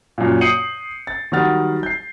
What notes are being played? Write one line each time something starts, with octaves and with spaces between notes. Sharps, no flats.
F#2 A#2
D#6 G6 C7 C#7 D#7 F#7
A6
D#3 F#3 G3 F#5 F6 A6
G6 C7